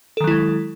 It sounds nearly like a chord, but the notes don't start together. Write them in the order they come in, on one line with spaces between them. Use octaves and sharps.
A4 D#3 F#3 E4 G#3